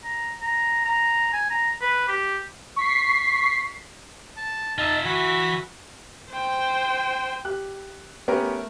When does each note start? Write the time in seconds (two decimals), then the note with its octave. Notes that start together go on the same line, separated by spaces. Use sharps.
0.04 A#5
0.42 A#5
0.85 A#5
1.33 G#5
1.50 A#5
1.81 B4
2.08 G4
2.76 C#6 B6 C7
4.36 A5
4.78 D#4 F4 E5 A5
5.05 E3 F#4 B5
6.32 C5 G5
7.45 G4 F#6
8.28 A3 B3 C#4 G4 A#4